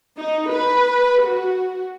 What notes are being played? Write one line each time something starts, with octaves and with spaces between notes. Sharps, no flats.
D#4
B4
F#4